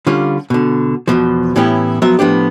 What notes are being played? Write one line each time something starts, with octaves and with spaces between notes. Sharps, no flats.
D3 G3 C#4 F4
B2 D3
E2 G2 B2 F3
A2 E3 B3 C#4 E4 G4
F3 F#3 B3 E5
A2 F3 B3 D4 G4